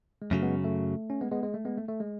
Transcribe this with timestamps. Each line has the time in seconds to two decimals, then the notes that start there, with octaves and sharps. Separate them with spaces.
0.22 G#3
0.31 F#2 C#3 F#3 A3
0.42 G#3 B3
0.64 A3
1.10 C#4
1.21 G#3 B3
1.31 G#3 B3
1.43 G#3
1.54 A3
1.65 G#3 B3
1.77 A3
1.88 A3
2.00 G#3